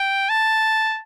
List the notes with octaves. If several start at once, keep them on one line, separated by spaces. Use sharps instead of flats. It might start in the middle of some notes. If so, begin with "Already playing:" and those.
Already playing: G5
A5